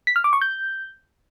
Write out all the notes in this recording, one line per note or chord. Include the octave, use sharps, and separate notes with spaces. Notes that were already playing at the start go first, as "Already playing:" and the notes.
B6
F6
D6
C#6
G6